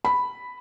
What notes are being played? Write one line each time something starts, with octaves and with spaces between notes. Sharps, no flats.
B5